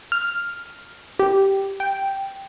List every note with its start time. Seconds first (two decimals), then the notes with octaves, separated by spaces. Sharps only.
0.12 F6
1.19 G4
1.80 G5